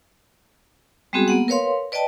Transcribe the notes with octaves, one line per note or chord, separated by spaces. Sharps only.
G3 G#3 B3 C4 F#4 G#4
A#3 B3 F#5
A#4 B4 C#5 F5 C6
B4 D5 D#5 G5 A5